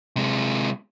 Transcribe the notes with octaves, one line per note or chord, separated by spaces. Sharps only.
C3 G#3